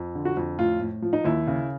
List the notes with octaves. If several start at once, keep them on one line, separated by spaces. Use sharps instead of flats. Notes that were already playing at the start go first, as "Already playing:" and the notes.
Already playing: F2
D3
F#4
F2
A2 F4
A2
F3
D#4
D#2 E4
C#3